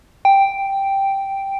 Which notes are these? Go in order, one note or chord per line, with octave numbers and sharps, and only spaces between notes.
G5